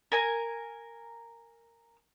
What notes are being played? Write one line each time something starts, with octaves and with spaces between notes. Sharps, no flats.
A#4 G#5 A#5